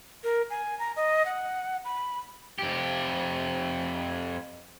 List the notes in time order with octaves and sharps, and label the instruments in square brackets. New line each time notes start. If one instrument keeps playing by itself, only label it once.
[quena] A#4
G#5
A#5
D#5
F#5
B5
[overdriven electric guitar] F2 G4